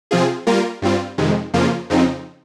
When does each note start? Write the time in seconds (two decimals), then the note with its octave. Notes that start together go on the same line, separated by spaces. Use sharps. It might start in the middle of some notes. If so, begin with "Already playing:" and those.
0.11 C3 F3 C4 F4 G#4
0.47 G3 A#3 F4 A#4
0.82 G2 G3 C4 F4
1.18 F2 C3 D#3 G#3
1.54 F2 C#3 F3 A#3 F4
1.90 F2 C#3 F3 C4 D#4